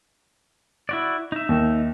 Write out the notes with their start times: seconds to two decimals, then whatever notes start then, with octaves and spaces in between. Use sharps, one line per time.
0.89 E4 F#4 D5
1.32 D#4 E5
1.49 D#2